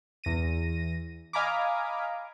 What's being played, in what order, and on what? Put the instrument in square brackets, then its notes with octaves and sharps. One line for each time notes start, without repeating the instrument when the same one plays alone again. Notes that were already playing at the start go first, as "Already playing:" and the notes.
[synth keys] E2 A#6 D#7
D#5 F5 G#5 A#5 B5 D6